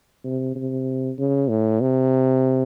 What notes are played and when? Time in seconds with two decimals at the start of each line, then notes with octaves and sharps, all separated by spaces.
0.24 C3
0.56 C3
1.18 C#3
1.49 A2
1.81 C3